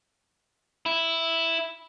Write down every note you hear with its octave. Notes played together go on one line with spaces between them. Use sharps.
E4